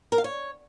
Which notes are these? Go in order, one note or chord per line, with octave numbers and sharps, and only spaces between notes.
A#4
F5
C#5